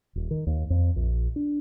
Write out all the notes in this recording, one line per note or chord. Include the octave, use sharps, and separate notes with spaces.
D#1
D#3
D#2
F2
A#1
D4